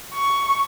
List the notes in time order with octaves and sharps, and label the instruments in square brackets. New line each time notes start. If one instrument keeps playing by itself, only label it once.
[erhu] C#6